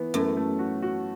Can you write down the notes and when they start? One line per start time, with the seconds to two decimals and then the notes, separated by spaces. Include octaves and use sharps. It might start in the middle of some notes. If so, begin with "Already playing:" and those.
Already playing: E3 B3
0.14 F#2 A3
0.37 A3
0.59 F#4
0.82 F#4